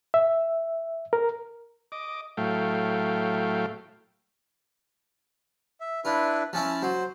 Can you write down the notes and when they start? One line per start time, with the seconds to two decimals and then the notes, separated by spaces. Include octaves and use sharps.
0.14 E5
1.13 A#4
1.92 D#5 D6
2.37 A2 F#3 A3 F5 G5
5.80 E5
6.05 D4 E4 F4 B4
6.53 F3 C#4 E4 A5
6.82 F#3 C5